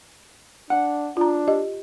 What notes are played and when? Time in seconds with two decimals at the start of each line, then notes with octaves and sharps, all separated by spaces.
0.70 D4 F#5
1.17 D4 F4 A#5
1.48 G4 D#5